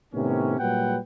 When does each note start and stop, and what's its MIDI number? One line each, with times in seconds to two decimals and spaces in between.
0.13 0.59 45
0.13 0.59 48
0.13 0.59 51
0.13 0.59 59
0.13 0.59 61
0.60 0.98 46
0.60 0.98 54
0.60 0.98 55
0.60 0.98 71
0.60 0.98 78
0.60 0.98 79